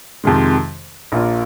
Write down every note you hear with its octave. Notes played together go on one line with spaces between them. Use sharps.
F2 C3 D#3 G#3
A#1 A#2 A#3 F4